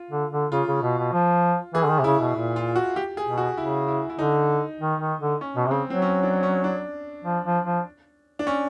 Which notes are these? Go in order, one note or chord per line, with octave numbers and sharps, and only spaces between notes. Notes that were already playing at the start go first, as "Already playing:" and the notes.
Already playing: F4
D3
D3
C#3 F4
C#3
B2
B2
F3
E3 G#4
D3
D#3
C3
C#3 E4
B2
A#2
F4
F#4
G4
G#4
B2
F#4
C#3 E4
E4
E4
D3 D#4
D#3
D#3
D3
C#4
B2
C3
C#3 C4
F#3 C4
C#4
D4
C#4
D4
F3
F3
F3
D4
C#4